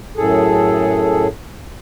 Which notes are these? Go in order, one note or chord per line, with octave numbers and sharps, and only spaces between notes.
F#2 A2 G#4 A4